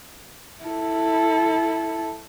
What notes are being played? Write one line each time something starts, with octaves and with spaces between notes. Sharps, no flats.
E4 A4